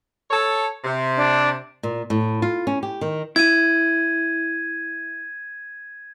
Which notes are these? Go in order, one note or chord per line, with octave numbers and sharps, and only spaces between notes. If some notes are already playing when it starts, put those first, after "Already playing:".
A4 C#5
C3
D4
A#2
A2
F4
C#4
G4
D#3
E4 G#6 D#7